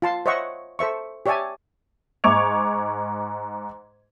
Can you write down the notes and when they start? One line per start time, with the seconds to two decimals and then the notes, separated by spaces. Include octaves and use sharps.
0.02 F4 A5 C6
0.26 C5 C#5 D#5 E5 F#5 C#6
0.79 A4 C5 E5 C#6
1.26 G4 C#5 D5 E5 G#5 A5
2.24 G#2 C#6 D6 G#6 F7